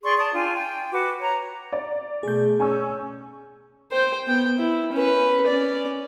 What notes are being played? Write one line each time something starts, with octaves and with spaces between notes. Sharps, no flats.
G#4 D5 C6 C#6
D5 A5 D#6
D4 F4 G5 G#5
G5
F#4 B4 D6
C#5 A#5
D5
B2 A3 G#4 G6
C#4 G#5 C#6 E6
C5 G5
B3 G5
E4
C#4 B4
C#4 D5